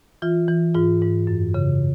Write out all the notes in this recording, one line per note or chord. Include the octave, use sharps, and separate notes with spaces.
E3 F4
E3
G#2 F4
G#2
F#2
C#3